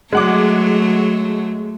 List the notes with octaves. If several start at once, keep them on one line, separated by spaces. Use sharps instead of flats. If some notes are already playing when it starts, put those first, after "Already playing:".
F#3 G#3 A3 F#5 D6